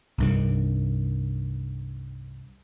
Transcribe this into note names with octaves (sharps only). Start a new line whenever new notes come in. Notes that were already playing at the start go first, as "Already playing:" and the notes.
C2 G2 D#3